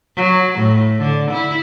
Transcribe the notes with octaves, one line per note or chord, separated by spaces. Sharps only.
F#3
A2
D3
E4